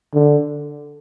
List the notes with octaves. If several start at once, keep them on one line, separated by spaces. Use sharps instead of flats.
D3